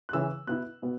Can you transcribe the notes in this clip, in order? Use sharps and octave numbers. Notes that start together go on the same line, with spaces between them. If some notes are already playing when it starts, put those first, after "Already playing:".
F#6
C#3 E3 C#4 E4 E6
B2 B3 E4 F#6
B2 B3